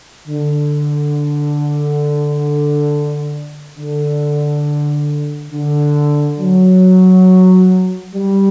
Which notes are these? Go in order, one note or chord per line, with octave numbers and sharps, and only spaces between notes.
D3
D3
D3
F#3
G3